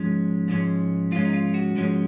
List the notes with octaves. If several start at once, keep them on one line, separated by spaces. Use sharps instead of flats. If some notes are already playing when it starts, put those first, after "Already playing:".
Already playing: G#2 F3 G#3 C#4
G#2 F3 G#3 C#4
G#2 F3 G#3 C#4 F4
D#4
F4
F#4
G#2 F3 G#3 C#4